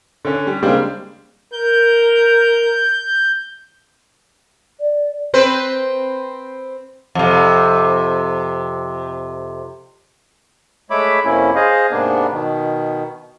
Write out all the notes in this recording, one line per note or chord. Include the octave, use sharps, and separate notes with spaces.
D3 C#4
G3
C#3 G3 G#3 A#3 C4 D4
A#4 G6
D5
C4 B4 C5
F2 C3
G#3 A3 C#5 E5 B5 D6
F2 C3 A#3 C#4 E4
G#4 C5 D#5 F5
G#2 C3 A#3 B3 D4
B2 D#3